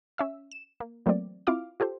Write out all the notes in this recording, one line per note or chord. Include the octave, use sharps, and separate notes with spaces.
C#4 E5 E6
E7
A#3
E3 F#3 A3 A#3 C4 D5
C4 E4 F4 F5 D6 F6
F4 G4 A4 C5